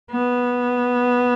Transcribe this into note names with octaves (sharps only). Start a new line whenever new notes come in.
B3